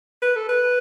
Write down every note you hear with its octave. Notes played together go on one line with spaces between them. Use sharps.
B4
A4
B4